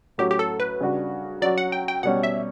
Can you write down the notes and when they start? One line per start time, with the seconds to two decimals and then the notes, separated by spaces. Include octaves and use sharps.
0.18 A2 F#3 C#4 F#4 G4
0.31 G4
0.39 A4
0.60 B4
0.80 C#3 G3 D4 F#4
1.42 F#3 C#4 F#4 D5
1.58 F#5
1.72 G5
1.88 G5
2.03 B2 G3 C#4 F#5
2.23 E5